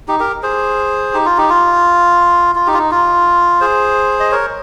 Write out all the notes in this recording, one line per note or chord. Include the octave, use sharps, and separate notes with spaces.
D#4 G4
G4 A#4
G#4 C5
D#4 G4
F4
D#4 G4
F4
F4
D#4 G4
F4
D#4
F4
G#4 C5
D#5
A#4 C#5